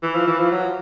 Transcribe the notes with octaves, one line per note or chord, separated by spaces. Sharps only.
E3
F3
E3
F3
F#3